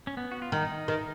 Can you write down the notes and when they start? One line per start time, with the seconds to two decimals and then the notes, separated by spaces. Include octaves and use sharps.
0.07 C#4
0.17 B3
0.32 F#4
0.42 F4
0.52 D#3 D#4
0.88 D#3